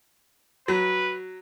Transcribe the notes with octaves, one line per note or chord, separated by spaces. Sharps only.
F#3 B4